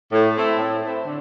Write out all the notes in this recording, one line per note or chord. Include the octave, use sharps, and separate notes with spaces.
A2
A3 C4 E4
A2
A3 C4 E4
D3